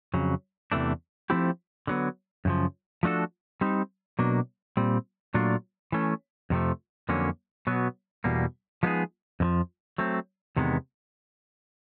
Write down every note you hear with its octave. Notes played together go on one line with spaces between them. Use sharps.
F2 C#3 F#3
E2 C3 E3 A3 D4
F3 A3 C4 E4 G4
D3 F#3 B3
F#2 C#3 F3
F3 A3 D4 F#4 A4
G3 C4 D#4
B2 F#3 A#3 D4
A#2 G3 C4
A#2 F#3 A3 D4 F4
E3 A3 C#4
F2 C3 F3 A3
F2 D3 F#3 A#3 C#4
B2 F#3 B3
E2 B2 G3 A#3
F3 G#3 B3 D#4 G#4
F2 D3 F3
F#3 A3 C4
E2 C3 D#3 G#3 B3